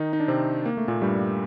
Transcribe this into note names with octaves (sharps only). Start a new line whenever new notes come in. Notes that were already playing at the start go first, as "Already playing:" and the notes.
Already playing: D#3 D#4
D#4
D4
C3 C4
A#3
A3
A#2 A#3
G2 G3